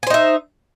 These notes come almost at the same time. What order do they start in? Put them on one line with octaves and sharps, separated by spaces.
G#5 C5 D#4 E5